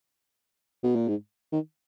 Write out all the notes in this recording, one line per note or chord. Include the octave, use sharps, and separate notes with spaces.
B2
A#2
G#2
D#3